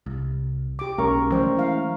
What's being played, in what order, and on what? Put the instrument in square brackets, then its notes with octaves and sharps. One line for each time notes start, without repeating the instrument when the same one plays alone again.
[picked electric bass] C2
[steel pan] G4 D6
[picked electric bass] B1 [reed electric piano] G#3 A#3 C#4 [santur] A#4 C#6
[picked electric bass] E3 F#3 A3 [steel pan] C5 D5 G5
[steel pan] E4 F5